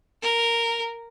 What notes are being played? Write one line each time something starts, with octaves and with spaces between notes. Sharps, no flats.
A#4